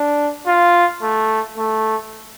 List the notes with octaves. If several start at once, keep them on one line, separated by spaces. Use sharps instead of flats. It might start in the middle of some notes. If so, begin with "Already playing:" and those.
Already playing: D4
F4
A3
A3